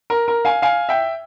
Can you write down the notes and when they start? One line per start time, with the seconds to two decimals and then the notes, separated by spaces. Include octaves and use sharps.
0.10 A#4
0.28 A#4
0.45 F5 G#5
0.62 F5 G#5
0.89 E5 G5